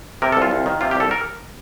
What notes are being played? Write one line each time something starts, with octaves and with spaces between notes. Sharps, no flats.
C3 A#4
A4
C2 F4
C2
D#3
C3 F4
G4
C2 A4
A#4